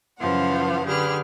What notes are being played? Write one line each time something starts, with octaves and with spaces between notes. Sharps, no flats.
F#2 C#3 E3 F3 F5 F#5
D3 G4 G#4 B4 F6